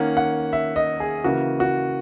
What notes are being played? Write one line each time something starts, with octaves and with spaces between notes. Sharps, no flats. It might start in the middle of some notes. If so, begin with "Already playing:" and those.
Already playing: D#3 A#3 C#4 F#5
F#5
E5
D#5
G#4
C#3 E3 A#3 F#4
F#4